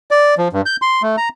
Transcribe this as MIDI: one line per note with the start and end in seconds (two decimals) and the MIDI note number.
0.11 0.35 74
0.38 0.48 53
0.53 0.62 43
0.66 0.77 91
0.82 1.02 84
1.02 1.16 57
1.17 1.29 82